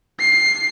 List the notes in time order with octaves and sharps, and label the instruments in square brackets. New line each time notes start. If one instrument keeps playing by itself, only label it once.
[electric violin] C7